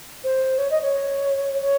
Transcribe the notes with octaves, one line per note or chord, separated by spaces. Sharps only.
C5
C#5
D#5
C#5
C#5